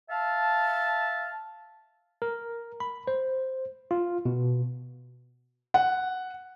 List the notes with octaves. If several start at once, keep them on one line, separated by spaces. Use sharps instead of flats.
E5 F5 A5
A#4
B5
C5
F4
B2
F#5